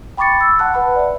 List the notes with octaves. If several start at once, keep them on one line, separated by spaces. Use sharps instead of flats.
G5 B5 C#6 D6 A6 C#7
E6
F#5 A5 F#6
B4 F#5 B5
D5 E5